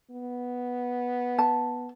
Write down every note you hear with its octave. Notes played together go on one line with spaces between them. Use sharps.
B3
A5